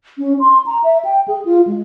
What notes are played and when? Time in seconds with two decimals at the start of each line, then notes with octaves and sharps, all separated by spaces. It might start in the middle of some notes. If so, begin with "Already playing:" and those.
0.18 C#4
0.40 C6
0.66 A#5
0.84 E5
1.05 G5
1.28 G#4
1.45 F4
1.67 G#3